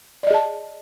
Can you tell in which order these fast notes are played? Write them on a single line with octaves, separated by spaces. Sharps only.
D5 D#5 G#4 A5